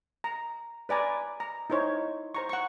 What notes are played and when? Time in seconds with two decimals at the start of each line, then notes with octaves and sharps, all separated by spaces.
0.24 A#5
0.89 B4 D5 G#5 A#5
1.40 A#5
1.70 D#4 E4 C5 C#5
2.35 C5 A#5 C#6
2.49 F#5 C#6